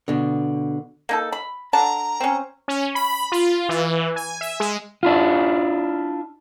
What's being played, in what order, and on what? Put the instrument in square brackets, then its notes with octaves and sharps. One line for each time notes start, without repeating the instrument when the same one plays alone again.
[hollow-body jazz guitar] B2 D3
[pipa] A#3 D#4 A4
B5
[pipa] D3 A5 [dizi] A#5
[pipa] C4 C#4
[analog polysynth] C#4
B5
F4
E3
G#5
E5
G#3
[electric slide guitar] D4 E4 F4